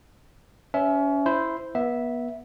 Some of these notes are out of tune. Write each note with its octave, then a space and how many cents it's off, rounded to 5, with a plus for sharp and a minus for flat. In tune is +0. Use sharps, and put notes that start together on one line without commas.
C#4 +30 C5 -30 E5 +0
E4 +0 C5 -5
B3 -30 E5 -5